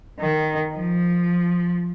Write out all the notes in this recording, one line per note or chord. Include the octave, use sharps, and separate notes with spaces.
D#3
F3